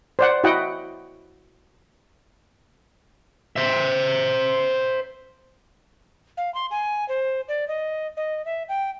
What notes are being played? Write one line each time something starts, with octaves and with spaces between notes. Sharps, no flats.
C5 D5 F#5
E4 F#4 D#5 F#5 G5
C5 E5
F5
C6
G#5
C5
D5
D#5
D#5
E5
G5